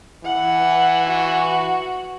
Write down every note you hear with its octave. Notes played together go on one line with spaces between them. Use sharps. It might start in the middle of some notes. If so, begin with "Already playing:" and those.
E3 F#5
F#4